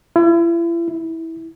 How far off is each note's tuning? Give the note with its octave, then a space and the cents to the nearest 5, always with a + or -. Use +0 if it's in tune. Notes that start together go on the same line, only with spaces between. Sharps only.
E4 +40
E4 -15